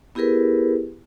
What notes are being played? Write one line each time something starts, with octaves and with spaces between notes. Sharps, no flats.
B3 E4 G4 G#4 A#4 B4